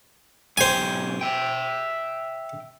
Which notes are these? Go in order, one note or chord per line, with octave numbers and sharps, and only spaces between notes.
B1 G4 C5 G#5
E5 G5